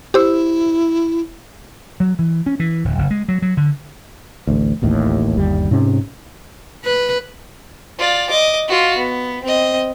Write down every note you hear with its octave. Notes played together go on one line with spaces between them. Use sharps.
E4 G4 C5 E6
F#3
E3
C#4
E3
D1
F#1
G#3
F#3
F#3
D3
A1 D2
D1 A1 D#2 A2
G1 D#2 G3
G#2 C3 C#4
B4
F4 D5
D#5 D6
F4 F#4
B3
C4 D#5